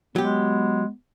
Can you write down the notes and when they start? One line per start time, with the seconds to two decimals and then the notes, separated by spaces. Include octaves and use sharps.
0.16 F#3 G#3 B3 G4